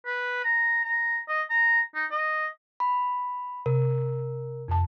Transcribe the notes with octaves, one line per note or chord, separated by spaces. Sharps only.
B4
A#5
A#5
D#5
A#5
D#4
D#5
B5
C3 A#4
F2 A5